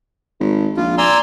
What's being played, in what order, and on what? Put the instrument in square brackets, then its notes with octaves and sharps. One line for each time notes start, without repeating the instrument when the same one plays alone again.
[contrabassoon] G#1
[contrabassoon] A#1 [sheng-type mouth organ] F4
[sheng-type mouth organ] D5 G#5 E6 [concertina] A#5 C6